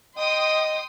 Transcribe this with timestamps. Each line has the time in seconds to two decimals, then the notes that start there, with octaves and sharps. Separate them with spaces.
0.17 D#5 G5 C6 D#6